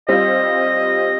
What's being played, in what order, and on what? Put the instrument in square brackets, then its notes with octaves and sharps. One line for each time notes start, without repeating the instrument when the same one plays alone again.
[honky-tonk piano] G3 C4 F4 [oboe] D#5